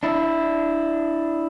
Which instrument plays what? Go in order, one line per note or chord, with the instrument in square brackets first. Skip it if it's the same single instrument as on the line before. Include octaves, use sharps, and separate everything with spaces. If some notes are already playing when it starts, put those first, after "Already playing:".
[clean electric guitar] D4 E4